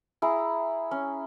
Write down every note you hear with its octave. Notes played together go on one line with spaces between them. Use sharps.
E4 G#4 A#5
C#4